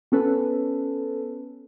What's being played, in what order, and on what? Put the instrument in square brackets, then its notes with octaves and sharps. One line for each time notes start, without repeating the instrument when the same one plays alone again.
[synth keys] B3 C#4 A4 B4